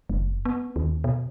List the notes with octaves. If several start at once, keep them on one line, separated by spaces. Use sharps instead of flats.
F#1
B3
D#2
B2